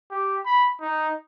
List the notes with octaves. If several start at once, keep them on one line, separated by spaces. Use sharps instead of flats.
G4
B5
D#4